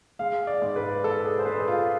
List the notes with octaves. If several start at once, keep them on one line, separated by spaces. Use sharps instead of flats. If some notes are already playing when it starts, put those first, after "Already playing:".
G#3 F5
D5
G#2
B4
G#2 A4
G#4
C5
G#3 B4
A4
G#4
F4